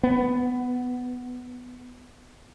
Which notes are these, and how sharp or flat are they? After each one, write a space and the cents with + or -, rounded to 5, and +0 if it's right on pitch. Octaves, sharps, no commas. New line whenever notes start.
B3 +10